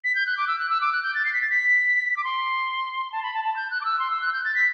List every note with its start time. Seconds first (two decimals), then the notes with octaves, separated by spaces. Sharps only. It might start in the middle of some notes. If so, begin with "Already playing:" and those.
0.04 B6
0.15 G6
0.26 F#6
0.37 D6
0.48 E6
0.59 F#6
0.70 E6
0.81 D6
0.92 F#6
1.03 G6
1.14 A6
1.25 C7
1.33 B6
1.41 A6
1.50 B6
2.17 D6
2.24 C6
3.12 A5
3.23 B5
3.34 A5
3.45 A5
3.56 G6
3.71 F#6
3.81 D6
3.85 E6
3.99 C6
4.11 E6
4.21 F#6
4.33 G6
4.44 A6
4.55 B6